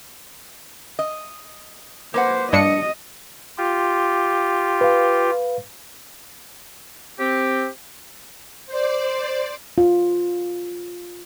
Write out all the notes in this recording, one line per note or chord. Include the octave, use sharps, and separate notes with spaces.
D#5
A#3 B4 C5 F#5
G2 D4 D#5 C#7
F4 G4
B4 F5
C4 G4
C5 D5
F4